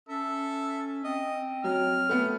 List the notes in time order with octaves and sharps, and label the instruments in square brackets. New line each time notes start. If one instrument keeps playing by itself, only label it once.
[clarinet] C#4 [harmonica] A4 E5
[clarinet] C4 [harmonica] D#5
[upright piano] F#3 [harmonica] F6
[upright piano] A3 B3